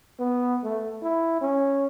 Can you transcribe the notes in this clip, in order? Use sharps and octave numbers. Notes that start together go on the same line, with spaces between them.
B3
A3
E4
C#4